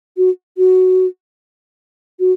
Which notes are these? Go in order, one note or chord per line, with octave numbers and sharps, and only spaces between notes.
F#4
F#4
F#4